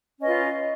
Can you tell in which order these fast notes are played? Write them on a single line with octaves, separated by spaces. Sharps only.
C#4 D#5 B4 F4